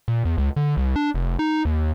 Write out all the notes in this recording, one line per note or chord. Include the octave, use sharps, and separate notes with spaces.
A#2
E2
C#2
D3
C2
D4
F1
D#4
D#2